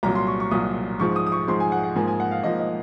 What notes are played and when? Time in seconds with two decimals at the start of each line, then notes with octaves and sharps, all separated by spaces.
0.03 C2 A#2 F#3 A#5
0.15 C6
0.27 C#6
0.40 C#6
0.51 C2 A#2 F#3 D#6
0.99 G#2 F3 G#3 C#6
1.16 D#6
1.26 D#6
1.32 C#6
1.47 G#2 F3 G#3 C6
1.60 G#5
1.72 F#5
1.84 F#5
1.95 G#2 F3 A#3 G#5
2.07 G#5
2.20 F#5
2.31 F5
2.43 G#2 F3 A#3 D#5
2.59 D#5